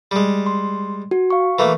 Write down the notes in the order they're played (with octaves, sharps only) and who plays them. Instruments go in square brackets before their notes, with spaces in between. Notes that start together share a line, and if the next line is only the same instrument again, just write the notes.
[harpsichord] G3 G#3
[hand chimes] C6
F#4
F5 C#6
[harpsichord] E3 A3 A#3